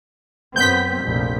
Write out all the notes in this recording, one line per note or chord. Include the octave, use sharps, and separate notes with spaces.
F#2 B3 C4 G6 B6
F1 A#1